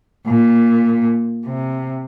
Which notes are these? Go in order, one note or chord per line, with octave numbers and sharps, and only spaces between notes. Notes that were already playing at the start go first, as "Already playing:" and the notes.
A#2
C3